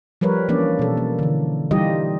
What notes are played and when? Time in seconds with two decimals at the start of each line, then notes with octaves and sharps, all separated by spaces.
0.21 F3 G3 A#4 B4 C#5
0.49 E3 A#3 C#4 D4 D5
0.79 B2 A4
0.97 A#3
1.19 D3 E3
1.71 E3 G3 D#4 F4 G4 D#5